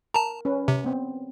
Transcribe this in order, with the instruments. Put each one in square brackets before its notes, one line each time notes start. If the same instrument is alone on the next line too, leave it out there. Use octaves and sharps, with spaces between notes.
[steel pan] A#4 [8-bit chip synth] A5 A#5
[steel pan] C#4 B4
[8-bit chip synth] C3
[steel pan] B3 C4